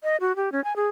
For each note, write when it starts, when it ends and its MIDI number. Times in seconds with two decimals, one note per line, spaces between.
0.03 0.16 75
0.21 0.35 66
0.36 0.52 67
0.52 0.63 61
0.64 0.75 80
0.76 0.89 68